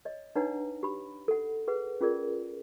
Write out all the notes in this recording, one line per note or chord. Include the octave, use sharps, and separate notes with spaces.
C#5 D#5
D4 D#4 B4 C#5 F#5 A#5
G4 B5
A4 F#5
G#4 B4 F#5
C#4 F4 G#4 A#4 D5